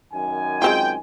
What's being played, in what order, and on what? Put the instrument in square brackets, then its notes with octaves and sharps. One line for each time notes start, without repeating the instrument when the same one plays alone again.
[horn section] F#2 D#3 G#5
[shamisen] G#3 C4 F4 [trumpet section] G5